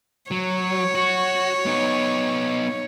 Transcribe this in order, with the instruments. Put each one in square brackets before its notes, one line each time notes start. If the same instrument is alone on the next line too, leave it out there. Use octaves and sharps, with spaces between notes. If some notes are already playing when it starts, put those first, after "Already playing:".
[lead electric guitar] F#3 [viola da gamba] C#5
[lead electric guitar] F#4
B3 D#4